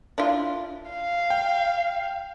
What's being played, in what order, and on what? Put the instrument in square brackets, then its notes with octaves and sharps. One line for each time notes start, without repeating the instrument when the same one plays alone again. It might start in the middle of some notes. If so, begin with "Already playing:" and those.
[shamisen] D4 E4 F4
[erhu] F5
[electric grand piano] G5